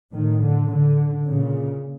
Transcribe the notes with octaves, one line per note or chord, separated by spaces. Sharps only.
A2 D#3
D3
D3
A#2 C#3